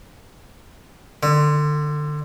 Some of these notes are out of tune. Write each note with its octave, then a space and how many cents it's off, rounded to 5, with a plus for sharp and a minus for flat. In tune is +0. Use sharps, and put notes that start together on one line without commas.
D3 +25